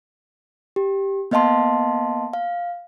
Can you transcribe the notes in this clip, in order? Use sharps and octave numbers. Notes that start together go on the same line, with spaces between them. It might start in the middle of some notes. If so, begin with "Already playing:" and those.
G4
A#3 B3 D#5 F5 A5 C6
F5